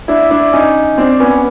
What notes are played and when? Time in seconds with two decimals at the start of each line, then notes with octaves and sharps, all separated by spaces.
0.08 D4 E4
0.30 D4 E4
0.53 C#4 D#4
0.98 C4 D4
1.20 B3 C#4